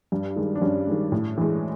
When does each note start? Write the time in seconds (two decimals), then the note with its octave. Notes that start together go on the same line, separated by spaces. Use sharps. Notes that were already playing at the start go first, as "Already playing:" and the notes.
0.12 G2
0.36 D#3 G#3
0.55 D4
0.62 G2 C#4
0.87 D#3 G#3
1.12 A2
1.38 E3 G#3